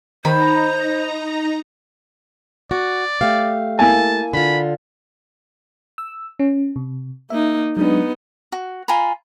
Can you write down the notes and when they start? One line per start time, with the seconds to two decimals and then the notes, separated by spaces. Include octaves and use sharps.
0.25 D#3 D#4 C5 A#5 B5
2.71 F#4 D5
3.21 A3 G4 F5
3.79 A#3 E4 G#5 A5
4.34 D3 F4 B5
5.98 E6
6.39 C#4
6.76 C3
7.30 A#3 D#4 E5
7.77 F#3 G#3 B3 D4 D#4
8.52 F#4
8.88 F4 G#5 A#5 B5